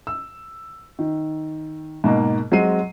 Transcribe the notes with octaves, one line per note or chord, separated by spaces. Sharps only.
E6
D#3
G#2 B2 A#3
F#3 G#3 C4 C7 D#7